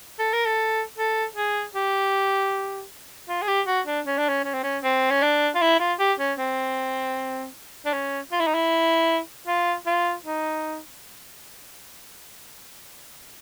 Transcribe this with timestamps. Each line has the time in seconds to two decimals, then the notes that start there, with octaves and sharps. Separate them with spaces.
0.19 A4
0.33 A#4
0.45 A4
0.97 A4
1.36 G#4
1.75 G4
3.29 F4
3.42 G#4
3.48 G4
3.67 F#4
3.86 D4
4.06 C#4
4.18 D4
4.29 C#4
4.44 C#4
4.54 C4
4.63 C#4
4.83 C4
5.11 C#4
5.22 D4
5.55 F4
5.61 E4
5.80 F4
5.99 G4
6.19 C#4
6.38 C4
7.85 D4
7.93 C#4
8.32 F4
8.40 E4
8.47 D#4
8.54 E4
9.47 F4
9.86 F4
10.25 D#4